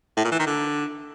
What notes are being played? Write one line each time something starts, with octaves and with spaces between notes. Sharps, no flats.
A2
A#2
E3
D#3
D3